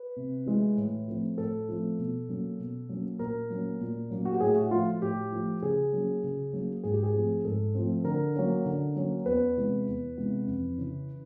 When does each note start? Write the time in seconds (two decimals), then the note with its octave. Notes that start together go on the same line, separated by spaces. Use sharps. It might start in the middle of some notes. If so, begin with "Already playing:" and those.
Already playing: B4
0.16 C3
0.46 E3 G#3
0.77 A2
1.08 F3 A3 C4
1.38 A2 A4
1.69 F3 A3 C4
1.98 B2
2.29 F#3 A#3 C#4
2.59 B2
2.89 F#3 A#3 C#4
3.19 A#2 A#4
3.50 F#3 A#3 C#4
3.80 A#2
4.10 F#3 A#3 C#4
4.25 F#4
4.33 G4
4.40 A2 G#4
4.56 F#4
4.71 F3 A3 F4
5.01 A2 G4
5.32 F3 A3
5.62 C#3 G#4
5.93 F#3 A#3 C#4
6.23 C#3
6.53 F#3 A#3 C#4
6.84 G#2 G#4
6.94 G4
7.03 G#4
7.14 F3 A3 C4
7.44 G#2 A4
7.75 F3 A3 C4
8.04 D3 A#4
8.35 F#3 A#3 C#4
8.65 D3
8.96 F#3 A#3 C#4
9.26 E2 B4
9.56 C3 E3 G#3 B3
9.87 E2
10.17 C3 E3 G#3 B3
10.47 F2
10.78 C#3 E3